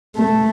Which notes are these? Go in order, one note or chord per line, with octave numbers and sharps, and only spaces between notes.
A3